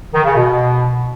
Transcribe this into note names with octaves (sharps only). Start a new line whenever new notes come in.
D#3
C#3
B2